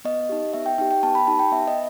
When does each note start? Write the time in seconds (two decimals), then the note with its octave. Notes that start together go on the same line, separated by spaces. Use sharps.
0.05 B3 D#5
0.29 D#4 G4
0.53 B3 E5
0.66 G5
0.78 D#4 G4 G5
0.91 G5
1.03 B3 A5
1.15 B5
1.27 D#4 G4 A5
1.39 G5
1.52 B3 E5
1.67 D#5